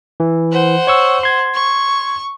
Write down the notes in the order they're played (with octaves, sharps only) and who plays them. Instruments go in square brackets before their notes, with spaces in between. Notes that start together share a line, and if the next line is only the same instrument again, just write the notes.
[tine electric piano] E3
[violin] C5 F#5
[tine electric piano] C#5 C#6 E6
C6 G#6
[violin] C#6